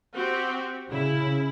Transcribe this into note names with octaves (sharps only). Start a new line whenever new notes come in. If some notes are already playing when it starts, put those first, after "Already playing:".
C4 F#4 G4
C#3 E4